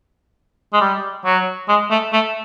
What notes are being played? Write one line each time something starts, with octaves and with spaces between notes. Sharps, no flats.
G#3
G3
F#3
G#3
A3
A3